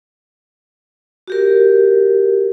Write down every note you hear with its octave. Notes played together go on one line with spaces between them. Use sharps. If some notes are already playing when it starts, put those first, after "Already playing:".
F#4 G4 A#4